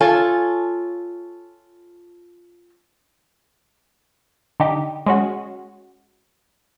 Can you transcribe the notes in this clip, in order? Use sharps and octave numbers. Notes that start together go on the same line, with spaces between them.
F4 A4 C#5 G#5
D3 D#4 G4
G#3 C#4 F#4